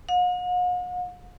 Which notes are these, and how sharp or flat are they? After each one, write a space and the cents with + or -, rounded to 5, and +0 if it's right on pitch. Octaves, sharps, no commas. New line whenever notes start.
F#5 -45